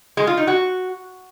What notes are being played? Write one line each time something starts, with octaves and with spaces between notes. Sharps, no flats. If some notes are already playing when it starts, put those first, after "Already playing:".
G#3
F4
D#4
F#4